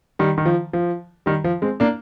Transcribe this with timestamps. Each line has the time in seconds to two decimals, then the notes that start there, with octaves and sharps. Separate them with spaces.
0.19 D#3 G3
0.38 D#3
0.46 F3
0.73 F3
1.26 D#3 G3
1.44 F3
1.62 G#3 C4
1.80 A#3 D4